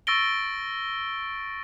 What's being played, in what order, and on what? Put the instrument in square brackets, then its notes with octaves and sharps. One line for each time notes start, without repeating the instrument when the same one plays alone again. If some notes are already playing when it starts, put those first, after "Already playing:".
[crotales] C#6 E6 A6 A#6 D7 G7